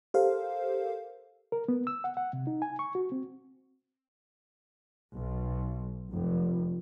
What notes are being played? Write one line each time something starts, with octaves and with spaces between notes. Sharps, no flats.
G4 A4 A#4 C5 F5
A#4
B3
E6
F#5
F#5
C3
D#4
G#5
C#6
F#4
C4
B1
F1